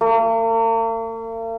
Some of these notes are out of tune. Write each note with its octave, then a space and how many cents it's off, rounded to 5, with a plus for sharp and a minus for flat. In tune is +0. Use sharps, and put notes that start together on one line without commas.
A#3 -45